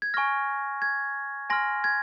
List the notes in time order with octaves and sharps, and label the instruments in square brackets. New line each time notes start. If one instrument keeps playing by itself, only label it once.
[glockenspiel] G#6
G#5 C#6 F6 A#6
G#6
G#5 C6 F6 A#6
G#6